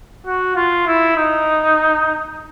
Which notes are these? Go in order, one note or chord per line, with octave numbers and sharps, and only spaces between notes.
F#4
F4
E4
D#4